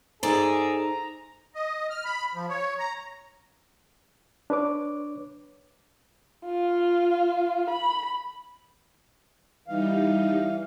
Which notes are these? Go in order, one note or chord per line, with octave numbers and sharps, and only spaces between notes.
D#4 G#4 A4 C5 D5 A#5
D#5
F6
B5
F3
C#5
A#5
D4 B4 C#5 D6
F4
B5
E3 G3 D#4 F5